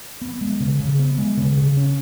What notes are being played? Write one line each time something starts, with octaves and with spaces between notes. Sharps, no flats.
B3
G#3
C#3
C#3
B3
G#3
C#3
C#3
C#4